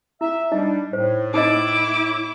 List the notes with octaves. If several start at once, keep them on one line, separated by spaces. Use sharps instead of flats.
E4 E5
G3 D4 D#4 D#5
A2 C5
D#4 E4 D#5 D6